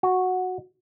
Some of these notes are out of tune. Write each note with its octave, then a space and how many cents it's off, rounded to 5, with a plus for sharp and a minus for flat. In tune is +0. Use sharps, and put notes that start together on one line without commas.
F#4 -5